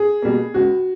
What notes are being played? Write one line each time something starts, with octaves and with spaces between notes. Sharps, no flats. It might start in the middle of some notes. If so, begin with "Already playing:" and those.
Already playing: G#4
B2 G3 A#3
C#2 F#4